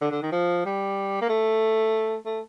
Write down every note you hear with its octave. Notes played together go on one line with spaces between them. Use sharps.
D3
D3
D#3
F3
G3
A#3
A3
A3